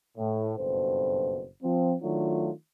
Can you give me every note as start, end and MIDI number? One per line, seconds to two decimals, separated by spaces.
0.18 0.53 45
0.58 1.46 30
0.58 1.46 43
0.58 1.46 47
0.58 1.46 69
0.58 1.46 72
1.63 1.95 53
1.63 1.95 60
2.02 2.50 51
2.02 2.50 54
2.02 2.50 57
2.02 2.50 62
2.02 2.50 65